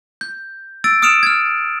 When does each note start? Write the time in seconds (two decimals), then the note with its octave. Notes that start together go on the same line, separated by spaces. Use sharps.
0.21 G6
0.84 E6 A6 D7
1.02 D#6 F6 C#7 D7 E7 F7
1.23 F6 G#6